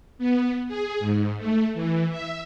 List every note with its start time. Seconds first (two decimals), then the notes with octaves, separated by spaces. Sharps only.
0.18 B3
0.68 G#4
0.99 G#2
1.38 A3
1.74 E3
2.10 E5